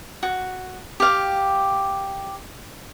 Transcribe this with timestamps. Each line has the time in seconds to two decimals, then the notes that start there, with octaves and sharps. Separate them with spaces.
0.23 F#4
1.00 G4 F5